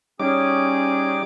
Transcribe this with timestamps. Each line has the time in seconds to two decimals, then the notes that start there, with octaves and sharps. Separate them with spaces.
0.20 G3 C#4 D#4 G#4 D6